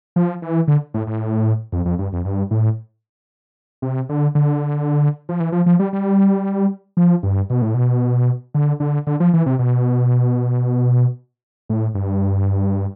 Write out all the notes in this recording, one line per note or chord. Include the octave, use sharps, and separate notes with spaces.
F3
E3
D3
A2
A2
F2
F2
G2
F2
G2
A2
C3
D3
D3
F3
E3
F3
F3
G3
G3
F3
G2
B2
A2
B2
D3
D3
D3
F3
E3
C3
B2
A2
G2